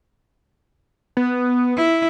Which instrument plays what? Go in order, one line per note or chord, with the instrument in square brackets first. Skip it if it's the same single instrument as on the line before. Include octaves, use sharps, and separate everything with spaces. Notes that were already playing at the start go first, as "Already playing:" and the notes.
[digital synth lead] B3
[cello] E4